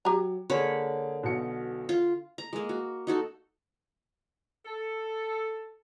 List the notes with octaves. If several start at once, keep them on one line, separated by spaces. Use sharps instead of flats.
F#3 G4 A#5
D3 A#3 G#4 C#5 B5
B1 B2 C#7
F4
A#5
G#3 A#3
F#4
D#4 F#4 A4
A4